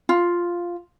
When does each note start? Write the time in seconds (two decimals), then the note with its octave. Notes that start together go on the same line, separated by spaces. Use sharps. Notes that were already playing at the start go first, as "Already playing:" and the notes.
0.09 F4